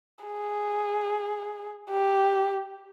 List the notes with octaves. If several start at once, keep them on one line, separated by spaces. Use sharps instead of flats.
G#4
G4